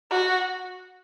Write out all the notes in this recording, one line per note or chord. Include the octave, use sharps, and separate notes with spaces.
F#4